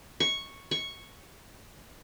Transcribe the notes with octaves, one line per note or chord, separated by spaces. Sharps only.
C#6
C#6